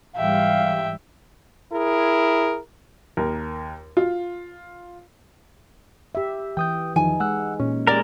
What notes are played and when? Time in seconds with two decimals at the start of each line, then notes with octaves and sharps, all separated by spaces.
0.16 G#2 E3 G3 E5 F5 G5
1.72 E4 G#4 A#4
3.17 D#2 A#4
3.97 F4
6.15 G4 E5
6.57 E3 G5 D#6 G6
6.96 E2 D#3 F3 D#4 G#5
7.20 G#3 F#5 E6 F#6
7.60 A#2 C#4
7.87 G#3 G4 A#4 D5